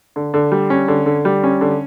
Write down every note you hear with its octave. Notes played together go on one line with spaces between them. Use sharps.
D3
D3
G3
C#4
D3
D3
G3
C#4
D3